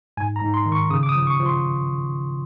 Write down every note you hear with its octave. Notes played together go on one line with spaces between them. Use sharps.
G#2 G#5
A#5
G#2
C6
D#3
C#6
C#3 D#6
D6
D#6
F3
C#6
F3
C6